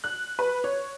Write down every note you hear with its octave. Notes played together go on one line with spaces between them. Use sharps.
F#6
B4
C#5